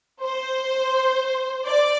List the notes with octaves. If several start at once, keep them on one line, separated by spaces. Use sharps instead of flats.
C5
D5